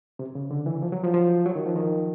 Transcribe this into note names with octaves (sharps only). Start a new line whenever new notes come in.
C3
C#3
D3
E3
F3
F#3
F3
F3
F#3
D#3
F3
D#3